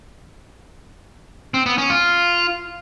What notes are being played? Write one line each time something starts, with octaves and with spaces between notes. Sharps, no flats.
C4
B3
C#4
F4